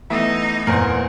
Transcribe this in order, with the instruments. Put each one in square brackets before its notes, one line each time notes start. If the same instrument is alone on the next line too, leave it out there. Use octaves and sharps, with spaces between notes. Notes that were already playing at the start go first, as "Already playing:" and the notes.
[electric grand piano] E3 A3 B3 [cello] D#4 [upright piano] E5 D#6 E6
[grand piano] E2 A#2 [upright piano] A#4 C5 F#5